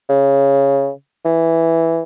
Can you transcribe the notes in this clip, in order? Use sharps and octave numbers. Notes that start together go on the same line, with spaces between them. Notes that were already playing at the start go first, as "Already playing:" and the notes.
C#3
E3